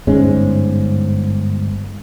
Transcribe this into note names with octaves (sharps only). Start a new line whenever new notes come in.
G1 G#2 G#3 C#4